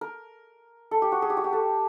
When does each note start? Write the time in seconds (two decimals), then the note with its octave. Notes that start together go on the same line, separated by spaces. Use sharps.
0.01 A#4
0.91 A4
1.02 G4
1.12 F#4
1.22 G#4
1.30 G4
1.37 F#4
1.44 G4
1.53 A4